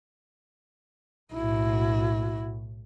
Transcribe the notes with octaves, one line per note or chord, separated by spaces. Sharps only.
B1 A2 E4 F#4